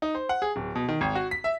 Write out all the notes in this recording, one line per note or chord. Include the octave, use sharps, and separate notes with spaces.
D#4
C5
F#5
G#4
D1
B2
D#3
G#1
F#4
B6
E5